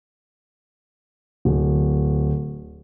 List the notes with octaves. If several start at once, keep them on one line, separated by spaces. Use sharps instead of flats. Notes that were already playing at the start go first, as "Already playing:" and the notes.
D1